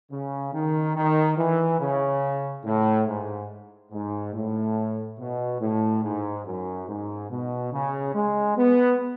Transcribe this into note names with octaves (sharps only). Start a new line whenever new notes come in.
C#3
D#3
D#3
E3
C#3
A2
G#2
G#2
A2
B2
A2
G#2
F#2
G#2
B2
C#3
G#3
B3